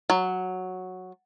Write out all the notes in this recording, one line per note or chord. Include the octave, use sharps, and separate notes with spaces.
F#3